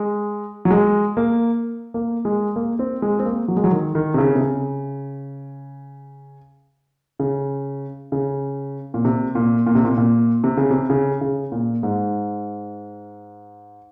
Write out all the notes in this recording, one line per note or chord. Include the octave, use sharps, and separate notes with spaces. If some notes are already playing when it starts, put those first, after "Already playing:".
Already playing: G#3
F#3
G#3
A#3
A#3
G#3
A#3
C4
G#3
C4
A#3
F#3
G#3
F#3
D#3
D#3
C3
C#3
C3
C#3
C#3
C#3
A#2
C3
A#2
A#2
C3
A#2
A#2
C3
C#3
C3
C#3
C#3
A#2
G#2